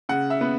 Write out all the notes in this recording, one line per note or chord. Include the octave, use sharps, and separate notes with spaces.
C#3 F#5
E5
B3